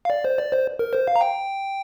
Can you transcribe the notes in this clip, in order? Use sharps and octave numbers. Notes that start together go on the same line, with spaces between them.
F5
D5
C5
D5
C5
A#4
C5
F5
A#5
G5